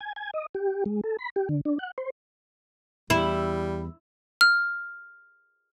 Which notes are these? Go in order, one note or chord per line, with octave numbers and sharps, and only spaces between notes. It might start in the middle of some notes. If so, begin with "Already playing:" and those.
G#5
G#5
D#5
G4
G#3
A4
B5
G4
D3
D4
F#5
C5
E2 G3 E4
F6